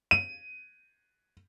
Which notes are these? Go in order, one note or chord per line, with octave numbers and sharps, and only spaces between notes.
D#7